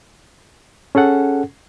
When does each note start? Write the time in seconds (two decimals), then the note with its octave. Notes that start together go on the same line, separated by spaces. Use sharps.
0.95 C#4 G#4 A4 F#5